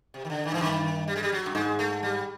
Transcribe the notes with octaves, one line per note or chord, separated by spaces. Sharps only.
C3
D#3
D3
D#3
G#2 E3
G2 D#3
G3
G#3
G3
F#3
G2
G#2 G#3
A3
G3